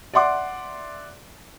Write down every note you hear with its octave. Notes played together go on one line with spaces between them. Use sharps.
D5 E5 F#5 C6 D6